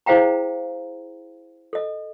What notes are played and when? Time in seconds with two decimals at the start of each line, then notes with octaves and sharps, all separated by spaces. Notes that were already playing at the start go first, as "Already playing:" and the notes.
0.06 E4 G#4 C5 F5 G5 A#5
1.73 A4 D#5